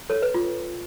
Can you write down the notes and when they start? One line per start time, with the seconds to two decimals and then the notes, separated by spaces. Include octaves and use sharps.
0.10 A4 C#5
0.22 B4
0.34 F4